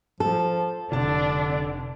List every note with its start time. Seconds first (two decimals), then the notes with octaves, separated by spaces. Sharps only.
0.20 F3 A4
0.92 F1 D3 D4 A5